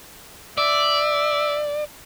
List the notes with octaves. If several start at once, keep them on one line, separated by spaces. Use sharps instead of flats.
D5 E5